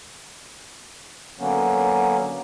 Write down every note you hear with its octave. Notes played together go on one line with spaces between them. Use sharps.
D3 F#3 A#3 B3 C#4